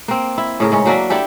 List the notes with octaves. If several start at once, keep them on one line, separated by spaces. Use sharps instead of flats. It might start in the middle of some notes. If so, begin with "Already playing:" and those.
A#3 C4
E4
A2 C#3 A#4
G#2 C#4
F#3 A#3 D4 E5
D4 E4 G4 A4